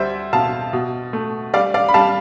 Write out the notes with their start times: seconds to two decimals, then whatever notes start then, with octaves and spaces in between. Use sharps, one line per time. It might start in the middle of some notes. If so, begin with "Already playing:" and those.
Already playing: D2 G3 C5 E5
0.33 B2 F5 A5
0.73 B2
1.13 A3
1.54 G3 D5 F5
1.74 D5 F5
1.89 B5
1.94 G3 F5 A5